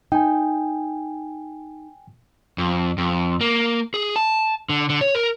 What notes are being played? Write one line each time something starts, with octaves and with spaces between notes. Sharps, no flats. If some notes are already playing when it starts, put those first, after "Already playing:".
D#4 G5 G#5
F2
F2
A#3
G#4
A5
D3
D3
C#5
A#4